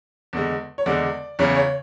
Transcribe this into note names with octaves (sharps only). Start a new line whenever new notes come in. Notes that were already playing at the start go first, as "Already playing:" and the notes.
E2 D3 G#3
C#5
E2 D3 G#3 D5
E2 C#3 E3 C#5
C#5